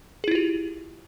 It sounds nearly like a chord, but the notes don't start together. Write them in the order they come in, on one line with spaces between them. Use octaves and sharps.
G#4 E4 F4 G4